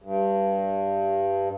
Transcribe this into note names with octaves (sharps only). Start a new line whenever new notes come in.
G2